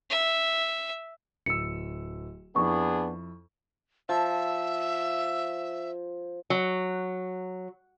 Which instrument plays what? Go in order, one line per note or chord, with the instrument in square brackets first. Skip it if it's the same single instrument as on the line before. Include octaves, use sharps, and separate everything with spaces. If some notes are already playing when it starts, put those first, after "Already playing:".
[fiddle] E5
[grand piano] D1 E6 [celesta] C#7
[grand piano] F2 E4 [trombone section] B3 D4 G#4 [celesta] C#6
[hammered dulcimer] F3 [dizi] E5
[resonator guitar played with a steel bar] F#3